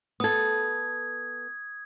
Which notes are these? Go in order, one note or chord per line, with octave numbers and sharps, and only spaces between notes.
B3 A4 D#6 G#6